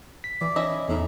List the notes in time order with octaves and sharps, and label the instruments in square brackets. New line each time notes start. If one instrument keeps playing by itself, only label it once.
[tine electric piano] B6
[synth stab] E3 [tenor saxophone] D5
[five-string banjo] C#4 E4 D#5
[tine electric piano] E2 D#4 [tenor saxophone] A2